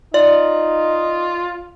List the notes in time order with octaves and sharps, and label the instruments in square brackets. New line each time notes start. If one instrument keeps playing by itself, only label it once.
[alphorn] D#4 [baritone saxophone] F4 [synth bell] D5 [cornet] D#5